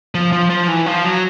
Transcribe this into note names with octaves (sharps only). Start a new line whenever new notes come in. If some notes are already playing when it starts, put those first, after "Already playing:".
F3
F3
F3
E3
F3
F#3